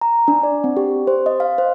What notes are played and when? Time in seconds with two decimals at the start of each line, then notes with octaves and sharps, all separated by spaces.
0.01 A#5
0.28 D4
0.43 D5
0.64 C4
0.77 G4
1.07 C5
1.26 D#5
1.40 F5
1.58 C5